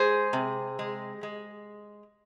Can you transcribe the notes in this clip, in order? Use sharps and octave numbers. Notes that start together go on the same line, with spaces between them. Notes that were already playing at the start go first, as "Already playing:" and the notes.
Already playing: G#3 G#4 C5
C3
G#3
G#3